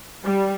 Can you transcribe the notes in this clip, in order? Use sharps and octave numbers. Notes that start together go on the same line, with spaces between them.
G3